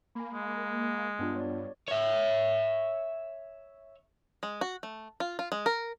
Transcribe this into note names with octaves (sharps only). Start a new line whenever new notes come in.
A#3 G#5 B5
G#3
G2 B3 D4 F4
C#5 D5
C#5 E5
G#3
F#4
A3
F4
F4
G#3
A#4